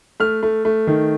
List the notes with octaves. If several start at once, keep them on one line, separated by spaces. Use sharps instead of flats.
A3 F6
A3
A3
D#3